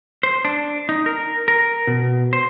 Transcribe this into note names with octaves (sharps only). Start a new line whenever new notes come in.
C5
D4
D#4
A#4
A#4
B2
C5